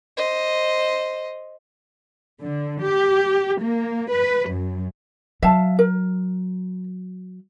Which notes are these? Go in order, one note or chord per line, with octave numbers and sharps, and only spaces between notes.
C5 D#5
D3
G4
A#3
B4
F#2
F#3 E5 F5 A5
A#4